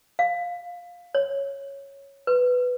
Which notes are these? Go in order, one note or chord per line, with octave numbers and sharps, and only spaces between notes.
F5
C#5
B4